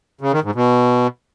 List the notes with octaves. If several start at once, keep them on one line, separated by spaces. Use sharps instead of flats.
C#3
D#3
G#2
B2